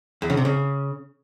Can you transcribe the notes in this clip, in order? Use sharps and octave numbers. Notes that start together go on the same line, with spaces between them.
E2
C#3
C3
C#3